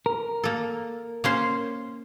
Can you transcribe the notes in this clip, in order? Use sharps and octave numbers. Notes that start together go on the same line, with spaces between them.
A#4
A#3 A4
A#3 C#4 C5